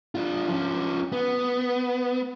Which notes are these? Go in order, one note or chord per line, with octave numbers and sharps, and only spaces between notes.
D4 F4
F3 C#4
B3